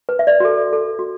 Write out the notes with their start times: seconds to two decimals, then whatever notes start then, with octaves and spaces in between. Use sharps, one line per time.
0.09 B4
0.19 E5
0.27 D5
0.40 F#4
0.45 A4
0.73 A4
0.99 F#4